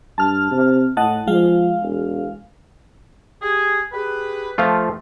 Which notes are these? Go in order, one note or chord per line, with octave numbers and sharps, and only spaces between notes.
G2 A5 F6
C3
A2 D#5 F#5 A5
F3 G#3 F5
E1
G4 G#4
G4 G#4 B4
F3 A3 F4